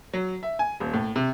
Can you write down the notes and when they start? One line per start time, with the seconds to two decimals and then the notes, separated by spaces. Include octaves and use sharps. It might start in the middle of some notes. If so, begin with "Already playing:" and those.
0.13 F#3
0.43 E5
0.59 G#5
0.80 D#1
0.93 A2
1.16 C3